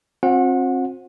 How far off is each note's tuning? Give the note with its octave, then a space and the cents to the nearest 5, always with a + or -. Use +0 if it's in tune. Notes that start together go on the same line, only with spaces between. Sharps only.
C4 +25 F4 +40 F#5 -25